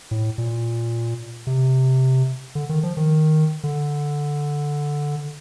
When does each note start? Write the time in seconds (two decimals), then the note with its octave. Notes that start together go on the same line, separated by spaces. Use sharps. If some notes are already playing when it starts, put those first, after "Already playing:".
0.11 A2
0.38 A#2
1.47 C3
2.55 D3
2.69 D#3
2.83 F3
2.97 D#3
3.64 D3